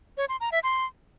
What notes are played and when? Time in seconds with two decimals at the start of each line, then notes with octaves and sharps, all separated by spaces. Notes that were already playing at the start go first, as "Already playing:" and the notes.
0.17 C#5
0.29 C6
0.40 A#5
0.52 E5
0.63 C6